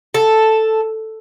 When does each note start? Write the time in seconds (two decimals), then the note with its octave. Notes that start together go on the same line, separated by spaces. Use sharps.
0.14 A4